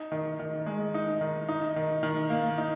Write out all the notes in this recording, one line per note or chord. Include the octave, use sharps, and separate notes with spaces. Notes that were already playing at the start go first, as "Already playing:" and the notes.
Already playing: D#4
D#3
D#3
G#3
D#4
D#3
D#4
D#3
D#3
A#3
D#4